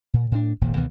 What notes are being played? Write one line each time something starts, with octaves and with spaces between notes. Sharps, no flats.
A#2
A2 D4
D#1 G#1 F2 A#2
C#2 B2 D#3 E3